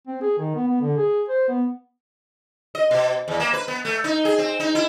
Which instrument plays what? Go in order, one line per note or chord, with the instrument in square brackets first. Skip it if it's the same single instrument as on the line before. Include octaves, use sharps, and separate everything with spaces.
[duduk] C4
G#4
D#3
B3
B3
D3
G#4
C5
B3
[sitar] D#5
B2
E2
A#3
B4
B3
A3
D#4
G#4
C4
D#4
E4